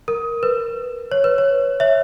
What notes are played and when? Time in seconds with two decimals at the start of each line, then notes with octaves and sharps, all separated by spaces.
0.08 A#4
0.43 B4
1.12 C#5
1.24 B4
1.38 C#5
1.80 C#5 E5